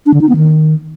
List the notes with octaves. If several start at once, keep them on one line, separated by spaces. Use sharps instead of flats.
D4
D3
D#4
B3
D#3